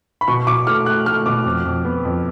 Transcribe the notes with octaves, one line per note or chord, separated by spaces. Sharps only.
B5
B2 C#6
B2 D6
A3 F6
A3 F#6
A3 F6
B2 D6
F2
F2
B3
F2